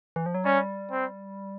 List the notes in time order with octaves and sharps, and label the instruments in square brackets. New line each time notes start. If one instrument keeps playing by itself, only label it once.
[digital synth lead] E3
F3
F#3
[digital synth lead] G3 [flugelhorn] C#4
[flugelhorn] C4